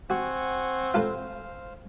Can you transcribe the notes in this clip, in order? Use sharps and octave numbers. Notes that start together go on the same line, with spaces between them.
C4 F#4 F#5 G#5 C#6
F4 A4 B4 C5 F5